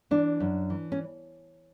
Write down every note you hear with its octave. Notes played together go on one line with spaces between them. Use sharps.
E3 D4
F#2
E3
C#4